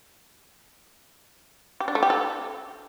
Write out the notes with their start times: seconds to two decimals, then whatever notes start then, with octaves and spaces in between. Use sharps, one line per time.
1.80 G4
1.88 D4
1.95 A3
2.03 G4
2.10 A4